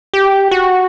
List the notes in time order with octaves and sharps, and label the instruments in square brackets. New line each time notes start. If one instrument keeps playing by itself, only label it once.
[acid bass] G4
F#4